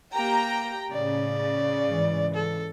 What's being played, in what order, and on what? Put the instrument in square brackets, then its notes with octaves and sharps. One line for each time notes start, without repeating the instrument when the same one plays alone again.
[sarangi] A#3 [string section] G4 G5 A#5
[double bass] A2 [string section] C#3 [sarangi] D5
[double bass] G#2 E3
[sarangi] A4